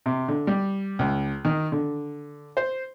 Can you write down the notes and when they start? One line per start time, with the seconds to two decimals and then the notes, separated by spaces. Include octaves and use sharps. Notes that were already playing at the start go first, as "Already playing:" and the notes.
0.06 C3
0.28 D3
0.47 G3
0.99 C#2
1.45 D#3
1.72 D3
2.57 C5